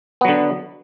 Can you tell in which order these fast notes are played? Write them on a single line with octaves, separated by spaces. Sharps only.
B3 F#3 D3